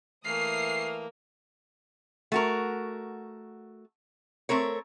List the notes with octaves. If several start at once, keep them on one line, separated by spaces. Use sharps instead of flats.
E3 A3 A#3 D#6 F6 C7
A3 F#4 A#4
A3 C4 A#4 C#5